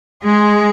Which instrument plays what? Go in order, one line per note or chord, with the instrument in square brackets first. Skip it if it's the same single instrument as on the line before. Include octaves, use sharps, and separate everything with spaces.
[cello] G#3 [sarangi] G#4